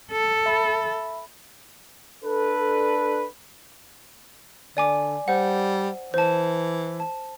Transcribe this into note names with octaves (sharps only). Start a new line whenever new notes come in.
A4
E5 B5
D4 A4 B4
D3 D5 G#5 D6
G3 C5 F#5
E3 C5 A5
A5